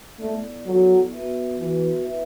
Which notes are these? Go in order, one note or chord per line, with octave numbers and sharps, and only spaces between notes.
A3 B3 E4 A4 D5
F#3 B3 E4 A4 D5
B3 F#4 B4 E5
E3 B3 F#4 B4 E5
B3 E4 B4 E5